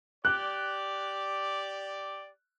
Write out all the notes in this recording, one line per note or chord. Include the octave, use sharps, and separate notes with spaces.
G4 D5 F#6